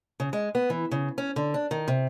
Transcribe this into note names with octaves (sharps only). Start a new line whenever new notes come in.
C#3
G#3
B3
E3
C#3
C#4
D3
D4
D#3
C3